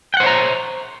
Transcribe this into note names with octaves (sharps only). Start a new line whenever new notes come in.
C5 C#5 F#5 G5 A#5